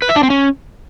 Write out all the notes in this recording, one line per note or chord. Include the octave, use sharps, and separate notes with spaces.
B4
E5
D4
C4
C#4